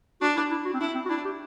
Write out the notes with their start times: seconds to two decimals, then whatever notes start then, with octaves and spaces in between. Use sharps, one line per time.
0.21 D4 F#4
0.36 E4
0.51 E4
0.65 F#4
0.74 C4
0.80 D4 E4
0.95 C4
1.05 F#4
1.10 D4 E4
1.25 G4